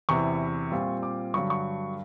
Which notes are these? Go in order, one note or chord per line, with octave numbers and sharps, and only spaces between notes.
E2 C3 E3 C#6
A#2 G3 C4 F4
D6
G2 D3 F#3 C#6
C#6